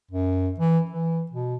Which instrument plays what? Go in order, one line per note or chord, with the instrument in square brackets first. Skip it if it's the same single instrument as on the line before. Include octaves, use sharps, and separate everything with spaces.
[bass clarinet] F#2
E3
E3
B2